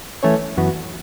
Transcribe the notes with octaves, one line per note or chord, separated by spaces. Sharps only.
E3 A3 C#4 A4 C#5
F#2 E3 B3 F#4